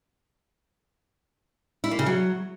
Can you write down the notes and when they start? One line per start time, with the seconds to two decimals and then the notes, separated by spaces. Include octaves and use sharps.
1.84 E4
1.91 A#3
1.99 C#3
2.06 F#3